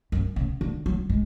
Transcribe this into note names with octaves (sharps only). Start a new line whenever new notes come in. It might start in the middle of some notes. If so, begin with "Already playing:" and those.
F#2
C#3
D3
F#3
G#3